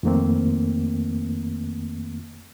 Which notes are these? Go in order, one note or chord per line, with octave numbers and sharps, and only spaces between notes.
F2 D#3 A3 A#3 C4